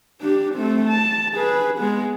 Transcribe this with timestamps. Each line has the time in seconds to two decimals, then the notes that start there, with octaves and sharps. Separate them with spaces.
0.21 D4 G4
0.54 A3 C4
0.88 A5
1.34 G#4 B4
1.79 G#3 B3